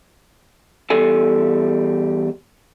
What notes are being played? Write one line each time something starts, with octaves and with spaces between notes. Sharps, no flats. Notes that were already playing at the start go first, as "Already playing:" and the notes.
E2 G3 A4 G#5